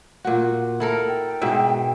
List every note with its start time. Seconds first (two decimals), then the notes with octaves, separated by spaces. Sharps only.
0.25 A#2 F#4
0.80 E4 A4 A#4
1.08 G5
1.41 G#2 B2 E5